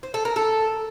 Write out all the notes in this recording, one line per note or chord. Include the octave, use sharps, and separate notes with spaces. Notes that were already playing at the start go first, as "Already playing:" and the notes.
C5
A4
A#4
A4